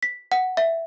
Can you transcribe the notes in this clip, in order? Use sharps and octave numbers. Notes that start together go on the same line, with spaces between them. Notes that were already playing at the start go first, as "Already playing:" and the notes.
B6
F#5
E5